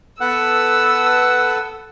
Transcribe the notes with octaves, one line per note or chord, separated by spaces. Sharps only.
B3 A4 B4 F#5 E6